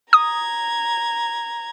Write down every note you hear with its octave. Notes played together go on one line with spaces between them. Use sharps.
A#5 D#6 G#6